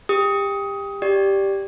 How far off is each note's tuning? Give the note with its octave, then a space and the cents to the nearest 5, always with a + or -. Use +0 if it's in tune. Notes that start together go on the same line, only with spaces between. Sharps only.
G4 +25 D#6 +15
G4 +0 D5 +0